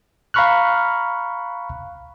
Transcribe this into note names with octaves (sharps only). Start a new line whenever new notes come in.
F5 A#5 B5 C#6 F6 F#6